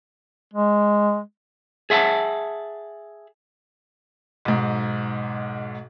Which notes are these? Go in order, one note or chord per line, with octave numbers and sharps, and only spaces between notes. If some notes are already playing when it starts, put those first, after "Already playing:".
G#3
G#4 E5 F#5 G#5 A5
B1 G#2